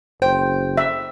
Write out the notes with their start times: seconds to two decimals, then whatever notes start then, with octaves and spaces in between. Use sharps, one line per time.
0.22 F#1 C5 G5
0.77 E5